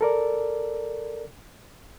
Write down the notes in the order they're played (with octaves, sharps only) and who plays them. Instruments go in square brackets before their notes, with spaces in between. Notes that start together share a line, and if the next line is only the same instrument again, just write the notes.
[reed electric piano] A4 A#4 D5